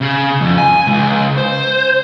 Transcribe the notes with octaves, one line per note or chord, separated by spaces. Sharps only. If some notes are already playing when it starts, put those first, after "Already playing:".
C#3
F2
G#5
C#2
C5